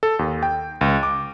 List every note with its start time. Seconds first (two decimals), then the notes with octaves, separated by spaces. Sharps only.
0.03 A4
0.19 D#2
0.43 G5
0.81 C#2
1.03 D6